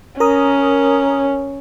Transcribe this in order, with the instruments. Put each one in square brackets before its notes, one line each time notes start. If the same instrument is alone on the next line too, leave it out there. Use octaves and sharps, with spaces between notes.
[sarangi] C#4 [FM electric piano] A#4 A#5 D#6